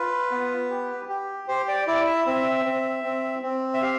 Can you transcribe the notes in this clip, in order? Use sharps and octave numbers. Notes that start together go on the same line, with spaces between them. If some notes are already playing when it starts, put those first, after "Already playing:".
Already playing: F4 B4
B3
G4
G4
G4 C5
D5
E4 D5
E5
C4 E5
C4
C4
C4
E5
G4 F5